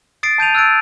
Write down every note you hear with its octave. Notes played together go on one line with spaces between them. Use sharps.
D#6 A6 C7 D7
A5 G6 D#7 F7
E6 F#6 G#6 A6 D7